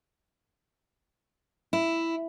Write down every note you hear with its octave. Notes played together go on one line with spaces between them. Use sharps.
E4